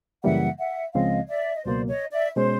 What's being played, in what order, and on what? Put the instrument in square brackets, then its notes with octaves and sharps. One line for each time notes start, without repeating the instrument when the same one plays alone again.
[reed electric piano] F#2 C#3 E3 G3 A#3 [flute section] E5 F#5
[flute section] E5 F#5
[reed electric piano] C#2 C#3 F3 G#3 C4 [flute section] D#5 F5
[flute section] D5 E5
D#5
[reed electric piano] C#2 B2 F#3 A#3 [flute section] C5 D5
[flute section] C#5 D#5
D5 E5
[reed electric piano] B2 G#3 C#4 [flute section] C5